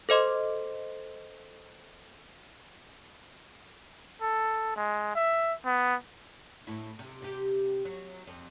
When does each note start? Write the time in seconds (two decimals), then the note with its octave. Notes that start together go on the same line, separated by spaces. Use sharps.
0.09 A4 C5 D#5 C6
4.22 A4
4.76 G#3
5.15 E5
5.65 B3
6.67 A2 E4
6.99 C3
7.22 C3 G4
7.85 F#3
8.27 F2